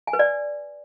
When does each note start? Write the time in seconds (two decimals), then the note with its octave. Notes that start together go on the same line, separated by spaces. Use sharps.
0.07 G#5
0.13 B4
0.19 D5